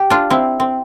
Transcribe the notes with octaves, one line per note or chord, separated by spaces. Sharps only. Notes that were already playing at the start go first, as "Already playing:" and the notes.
Already playing: G4
D4 F4
C4 E4
C4